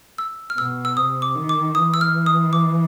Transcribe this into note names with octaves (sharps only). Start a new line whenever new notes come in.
E6
F6
B2 E6
E6
C3 D#6
D6
D#3
D6
E3 D#6
E6
F6
D#6
D6